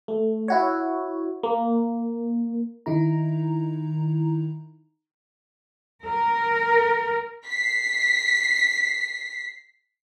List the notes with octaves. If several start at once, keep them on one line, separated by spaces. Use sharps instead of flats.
A3
E4 F#4 C#5
A#3
D#3 D#4 E4 A#5
A#4
B6 C7